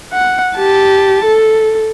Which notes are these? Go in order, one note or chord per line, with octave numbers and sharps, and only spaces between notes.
F#5
G4 A5
A4